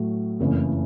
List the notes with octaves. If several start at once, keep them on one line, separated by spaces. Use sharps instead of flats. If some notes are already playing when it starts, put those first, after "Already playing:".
Already playing: A2 F#3 A3
F#1 F2 C#3 E3 A3